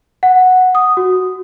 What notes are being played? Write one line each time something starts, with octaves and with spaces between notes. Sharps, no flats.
F#5
D#6
F#4